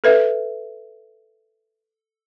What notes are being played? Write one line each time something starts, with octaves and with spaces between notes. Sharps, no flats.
A4 B4 E5